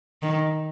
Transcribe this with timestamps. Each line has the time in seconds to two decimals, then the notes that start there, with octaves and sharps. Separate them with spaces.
0.22 D#3